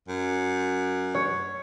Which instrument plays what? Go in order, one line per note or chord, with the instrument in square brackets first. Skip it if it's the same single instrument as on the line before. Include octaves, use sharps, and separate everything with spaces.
[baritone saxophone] F#2
[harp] C#5